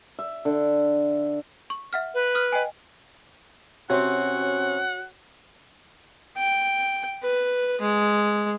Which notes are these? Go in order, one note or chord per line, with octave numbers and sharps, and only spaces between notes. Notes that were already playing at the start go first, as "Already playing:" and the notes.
E5
D3
C#6
E5 F#5 F6
B4
D#6 F6
D#5 G5 G#5
C3 C4 C#4 F#4 C#5 F#5
G5
B4
G#3